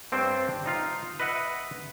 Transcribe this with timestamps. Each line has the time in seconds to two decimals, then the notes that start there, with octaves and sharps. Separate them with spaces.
0.12 G2 C4 D4 C5 C#5 G5
0.66 D#4 F4 F5
1.20 B4 D#5 E5 F#5